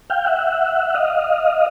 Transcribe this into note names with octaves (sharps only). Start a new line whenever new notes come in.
F5 G5
E5 F#5
D#5 F5